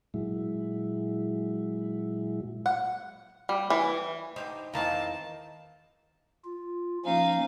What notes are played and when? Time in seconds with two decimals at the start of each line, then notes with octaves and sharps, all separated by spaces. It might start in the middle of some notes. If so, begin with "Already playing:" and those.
0.14 A#2 F#3 G#3 E4
2.66 F#5
3.49 G3
3.70 E3
4.36 D3 D#4 G4 C5
4.74 E2 D#3 C4 D#4 F5 A5 A#5
6.45 F4
7.05 F3 A#3 C#4 D#4 F5